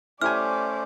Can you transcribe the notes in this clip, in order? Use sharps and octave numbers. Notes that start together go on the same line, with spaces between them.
A3 C#4 E4 G4 C5 D5 G#5 F6